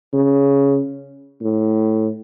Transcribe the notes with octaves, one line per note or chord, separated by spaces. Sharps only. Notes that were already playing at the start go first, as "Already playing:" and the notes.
C#3
A2